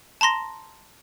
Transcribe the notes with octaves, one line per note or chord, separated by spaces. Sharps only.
A5 A#5 C6 A#6